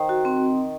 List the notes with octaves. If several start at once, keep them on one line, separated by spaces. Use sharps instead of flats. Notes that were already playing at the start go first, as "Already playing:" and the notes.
Already playing: D#3 C5
F#4
C4